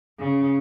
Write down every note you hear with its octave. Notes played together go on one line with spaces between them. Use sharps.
C#3